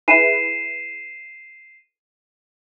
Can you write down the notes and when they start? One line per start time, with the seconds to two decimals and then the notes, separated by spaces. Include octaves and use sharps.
0.08 E4 G#4 B4 C7 D#7 E7